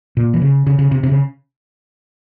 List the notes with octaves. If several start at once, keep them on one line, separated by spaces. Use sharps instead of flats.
A#2
E3
C#3
C#3
C#3
C3
C3
C#3